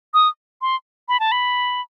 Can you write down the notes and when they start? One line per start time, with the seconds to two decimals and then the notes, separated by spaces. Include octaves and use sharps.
0.14 D#6
0.62 C6
1.09 B5
1.20 A5
1.32 B5